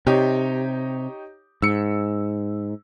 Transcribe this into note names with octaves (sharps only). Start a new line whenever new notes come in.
C3 D#4 G4 C#5
G#2 E6 C#7